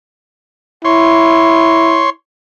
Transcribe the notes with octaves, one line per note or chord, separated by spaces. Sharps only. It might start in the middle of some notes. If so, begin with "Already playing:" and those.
E4 C#5 C6